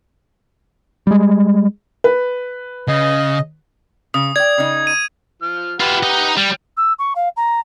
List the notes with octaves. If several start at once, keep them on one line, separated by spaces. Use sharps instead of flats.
G3 G#3
B4
C#3 D#5
C#3 D#6
D5 G5 G#6
C#3 D#4
D#7
F3 F6
E4 F4 G4 B4 F#5
D#4 D#5
G3
E6
C#6
F5
A#5